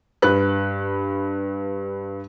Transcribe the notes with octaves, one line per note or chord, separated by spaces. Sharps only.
G2 B4 F#6